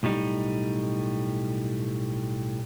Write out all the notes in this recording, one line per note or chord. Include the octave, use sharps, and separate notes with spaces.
B1 A2 G3 D#4